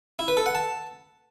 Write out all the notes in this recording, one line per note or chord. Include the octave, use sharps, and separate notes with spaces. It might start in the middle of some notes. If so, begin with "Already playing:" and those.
E4
B4
A4
F#5
A5